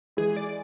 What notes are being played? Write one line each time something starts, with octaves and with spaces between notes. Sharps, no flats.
E3 G#3 G#4
D5